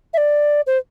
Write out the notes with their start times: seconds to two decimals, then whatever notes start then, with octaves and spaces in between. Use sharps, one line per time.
0.13 E5
0.17 D5
0.67 C5